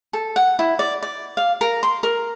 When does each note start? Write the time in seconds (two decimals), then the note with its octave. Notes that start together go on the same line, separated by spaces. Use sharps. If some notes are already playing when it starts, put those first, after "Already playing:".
0.13 A4
0.36 F#5
0.59 E4
0.79 D5
1.03 D5
1.37 F5
1.61 A#4
1.83 C6
2.03 A#4